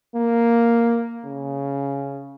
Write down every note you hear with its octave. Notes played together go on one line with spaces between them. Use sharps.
A#3
C#3